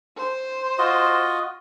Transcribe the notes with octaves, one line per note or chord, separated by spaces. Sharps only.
C5
F4 F#4 D#5